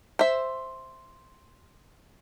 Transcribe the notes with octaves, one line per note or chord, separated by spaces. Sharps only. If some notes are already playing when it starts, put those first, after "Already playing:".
C5 E5